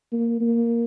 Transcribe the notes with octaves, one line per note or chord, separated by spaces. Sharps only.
A#3
A#3